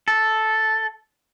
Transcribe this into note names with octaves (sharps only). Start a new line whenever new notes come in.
A4